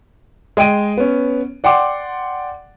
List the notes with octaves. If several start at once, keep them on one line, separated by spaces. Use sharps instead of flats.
G#3 D#5 G5 D7 D#7
B3 C#4
D5 F#5 G5 C6 D6